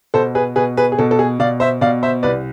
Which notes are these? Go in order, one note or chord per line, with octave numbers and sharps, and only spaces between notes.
B2 A4 C5
G#4 B4
B2 G#4 B4
G#4 B4
G#4
B2 A4
A4
G#4
B2 D5 F5
C5 E5
B2 D5 F5
C5 E5
C2 B4 D5